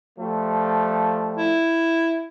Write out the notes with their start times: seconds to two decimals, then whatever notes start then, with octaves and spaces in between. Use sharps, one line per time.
0.19 F3 G3 A3
1.37 E4